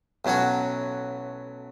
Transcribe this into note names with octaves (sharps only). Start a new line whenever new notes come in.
B1 A2 F#3 C#4 F#4